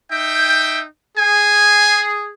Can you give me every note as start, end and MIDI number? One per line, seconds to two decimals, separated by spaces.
0.11 0.82 63
0.11 0.82 76
0.11 0.82 79
1.18 2.31 68
1.18 2.04 80